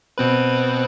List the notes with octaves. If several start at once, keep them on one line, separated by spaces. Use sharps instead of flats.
B2 C4 B4